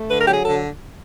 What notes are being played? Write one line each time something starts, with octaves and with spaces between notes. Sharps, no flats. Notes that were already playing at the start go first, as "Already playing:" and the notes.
Already playing: A3
D3 B4
A#4
F#3 G4
G#4
D3 A4